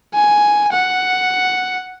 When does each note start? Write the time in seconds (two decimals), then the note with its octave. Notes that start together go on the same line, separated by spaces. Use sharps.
0.14 G#5
0.72 F#5